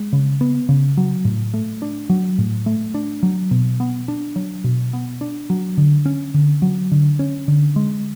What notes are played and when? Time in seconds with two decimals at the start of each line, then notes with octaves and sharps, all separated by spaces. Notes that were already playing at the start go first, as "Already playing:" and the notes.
Already playing: G#3
0.13 C#3
0.41 B3
0.69 C#3
0.97 F#3
1.25 A2
1.54 A3
1.82 D4
2.10 F#3
2.38 A2
2.66 A3
2.94 D4
3.23 F#3
3.51 B2
3.80 B3
4.08 D4
4.36 F#3
4.64 B2
4.93 B3
5.21 D4
5.50 F#3
5.78 D3
6.06 C#4
6.34 D3
6.62 F#3
6.92 D3
7.19 C#4
7.48 D3
7.76 G#3